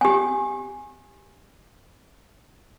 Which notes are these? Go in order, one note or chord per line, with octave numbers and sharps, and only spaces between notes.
G4 G#5